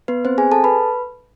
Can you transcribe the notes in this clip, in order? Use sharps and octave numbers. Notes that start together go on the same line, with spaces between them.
B3 B4
C4 C5
G#4 G#5
A4 A5
B4 B5